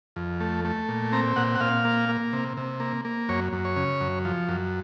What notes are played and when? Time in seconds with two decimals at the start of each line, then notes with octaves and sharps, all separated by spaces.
0.16 F2
0.40 A3
0.65 A3
0.89 A#2
1.12 C4 A#5
1.36 A#2 F#5
1.55 F#5
1.60 A#2 F5
1.85 A#3
2.09 A#3
2.33 C3
2.57 C3
2.80 A#3
3.05 A#3
3.29 F#2 C#5
3.53 F#2
3.65 C#5
3.76 C#3
4.00 F#2
4.25 F3
4.49 F#2